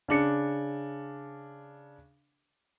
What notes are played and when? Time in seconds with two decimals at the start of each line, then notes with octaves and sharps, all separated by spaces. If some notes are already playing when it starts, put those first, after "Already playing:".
0.08 C#3 D4 C#7